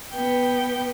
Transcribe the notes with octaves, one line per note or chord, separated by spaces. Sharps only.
B3 G5